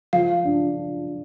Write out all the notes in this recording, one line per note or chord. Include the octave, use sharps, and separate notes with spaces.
F3 F5
D4